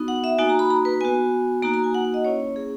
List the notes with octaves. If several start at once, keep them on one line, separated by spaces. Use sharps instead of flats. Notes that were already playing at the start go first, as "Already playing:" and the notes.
Already playing: B3 D#4 F#4
F#5
E5
A#3 D#4 F#4 G#5
A#5
B5
A#5
B4
B3 F#4 G#5
A#3 D#4 F#4 A#5
A#5
G#5
F#5
F#5
D#5
A#3 C#4 E4 C#5
G#4